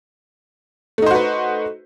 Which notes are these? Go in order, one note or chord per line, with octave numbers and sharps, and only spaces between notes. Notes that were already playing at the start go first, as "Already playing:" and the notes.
A3 D#4 F#4 B4 C5